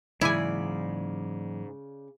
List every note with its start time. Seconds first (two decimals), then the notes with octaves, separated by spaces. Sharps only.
0.21 G#2 C#3 E3 F#3 A#3 E4 D5 G#5